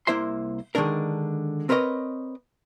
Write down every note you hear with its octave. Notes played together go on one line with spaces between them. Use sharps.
C2 A#3 E4 C5 E5 C6
D3 D#3 G#3 A3 D4 A#4
C4 A#4 B4 C#5 D#5